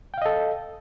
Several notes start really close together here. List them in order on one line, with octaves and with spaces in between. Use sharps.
G5 F5 D#5 A4